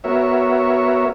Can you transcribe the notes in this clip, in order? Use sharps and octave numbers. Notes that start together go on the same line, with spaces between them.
B3 F#4 A#4 C#5 E5